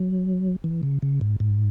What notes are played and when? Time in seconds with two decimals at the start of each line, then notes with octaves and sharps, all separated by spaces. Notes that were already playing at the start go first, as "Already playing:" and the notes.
Already playing: F#3
0.64 E3
0.83 C#3
1.02 C#3
1.21 G#2
1.40 G#2